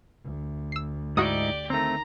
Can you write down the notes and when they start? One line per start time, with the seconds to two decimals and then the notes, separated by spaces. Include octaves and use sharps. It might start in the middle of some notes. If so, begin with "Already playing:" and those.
0.24 D2
0.72 E6 C7
1.17 G#2 D#4 E4 F#4 G4 D5 D#6
1.70 D3 D#3 A3 C4 A#5